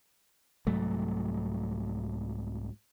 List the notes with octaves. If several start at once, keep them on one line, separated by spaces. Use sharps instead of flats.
C2 G#2 F#3 A3